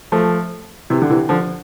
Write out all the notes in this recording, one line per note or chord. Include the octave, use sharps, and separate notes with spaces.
F3 A3
C3 E3
D3
C3 E3
D3 F3